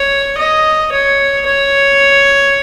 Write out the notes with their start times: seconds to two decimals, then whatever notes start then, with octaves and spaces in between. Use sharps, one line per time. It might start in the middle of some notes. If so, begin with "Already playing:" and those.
Already playing: C#5
0.38 D#5
0.92 C#5
1.46 C#5